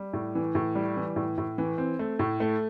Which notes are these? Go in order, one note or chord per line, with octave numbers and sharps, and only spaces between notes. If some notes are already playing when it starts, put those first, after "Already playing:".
Already playing: G3
A2
E3
A2
G3
E3
A2
A2
E3
C4
A3
A2
A3